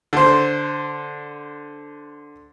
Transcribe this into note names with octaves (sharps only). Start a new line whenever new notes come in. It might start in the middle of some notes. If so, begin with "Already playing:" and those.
D3 C5